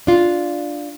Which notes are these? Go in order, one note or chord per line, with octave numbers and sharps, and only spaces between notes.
D4 F4